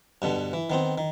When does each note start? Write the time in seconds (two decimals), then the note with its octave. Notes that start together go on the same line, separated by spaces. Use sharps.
0.22 G2 B2 D3
0.53 E3
0.70 D#3 B3 C4
0.98 D#3